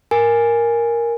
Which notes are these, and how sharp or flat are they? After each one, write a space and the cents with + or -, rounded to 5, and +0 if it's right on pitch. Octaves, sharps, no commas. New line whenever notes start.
A#4 +0 G#5 -5